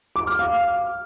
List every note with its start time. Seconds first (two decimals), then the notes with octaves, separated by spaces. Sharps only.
0.16 D6
0.27 F6
0.39 F5